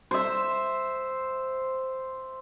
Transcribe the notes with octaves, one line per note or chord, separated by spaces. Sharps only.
C5 E5